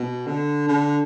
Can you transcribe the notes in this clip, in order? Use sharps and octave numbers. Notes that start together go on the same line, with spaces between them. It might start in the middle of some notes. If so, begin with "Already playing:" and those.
Already playing: B2
D3
D3